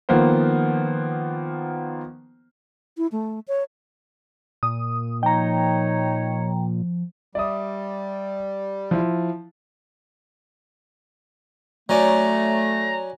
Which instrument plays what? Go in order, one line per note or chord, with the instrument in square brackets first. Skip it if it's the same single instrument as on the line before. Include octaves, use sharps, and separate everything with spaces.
[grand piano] D#3 F3 A#3 B3 C5
[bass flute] E4
A3
C#5
[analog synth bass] A#2 [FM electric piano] D#6
[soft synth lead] F3 [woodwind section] D#4 C#5 [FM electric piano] G5 A#5
[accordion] G3 [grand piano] D5 E5 D#6
[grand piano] F3 E4
[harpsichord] F#3 C#4 D5 [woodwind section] A3 [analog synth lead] A#5